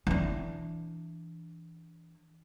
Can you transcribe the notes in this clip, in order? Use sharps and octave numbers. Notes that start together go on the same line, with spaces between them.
E3 D4